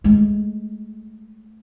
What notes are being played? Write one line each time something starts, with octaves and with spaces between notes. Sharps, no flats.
G#3 A3